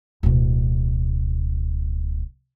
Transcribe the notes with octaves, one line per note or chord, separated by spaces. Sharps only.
D1 B2